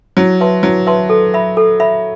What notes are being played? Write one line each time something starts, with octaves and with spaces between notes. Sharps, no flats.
F#3 E4
B4 E5 A5 C6
F#3 E4
B4 E5 A5 C6
A4
E5 B5
A4
E5 B5